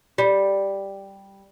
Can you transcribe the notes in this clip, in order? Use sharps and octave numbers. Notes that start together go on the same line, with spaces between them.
G3